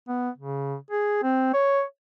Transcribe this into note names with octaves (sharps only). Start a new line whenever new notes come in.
B3
C#3
G#4
C4
C#5